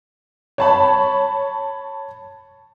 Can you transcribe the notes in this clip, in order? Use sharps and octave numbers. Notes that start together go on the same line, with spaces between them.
C#5 A5 B5